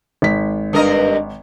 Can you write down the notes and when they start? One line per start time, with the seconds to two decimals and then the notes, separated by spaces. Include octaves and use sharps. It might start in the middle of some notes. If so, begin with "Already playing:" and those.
0.22 G#1 B6
0.73 G2 A#4 D#5